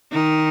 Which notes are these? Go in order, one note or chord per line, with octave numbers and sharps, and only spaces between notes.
D#3 D#4